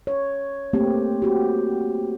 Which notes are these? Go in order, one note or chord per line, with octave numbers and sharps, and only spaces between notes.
C#5
A3 A#3 C4 G4
F#4 G4